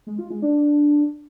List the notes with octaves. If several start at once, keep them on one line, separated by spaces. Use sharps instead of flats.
G#3
F4
G#3
D4